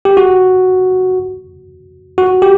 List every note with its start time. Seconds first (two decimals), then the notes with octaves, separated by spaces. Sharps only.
0.05 G4
0.17 F#4
2.18 F#4
2.42 G4